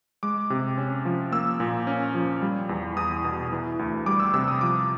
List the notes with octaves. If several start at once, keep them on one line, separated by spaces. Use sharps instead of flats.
G#3 D6
C3
C#4
F3
A#3 E6
A#2
C#4
F3
G3
E2
E2 D#6
B2
E3
D2
G3 D6
E6
C3 E6
D#6
F3 D6